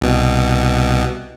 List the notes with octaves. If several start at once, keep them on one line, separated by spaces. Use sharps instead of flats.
C2 B2